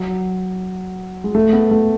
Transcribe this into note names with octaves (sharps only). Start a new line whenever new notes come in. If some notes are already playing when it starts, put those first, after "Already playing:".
Already playing: F#3
G#3
A3
B3
A3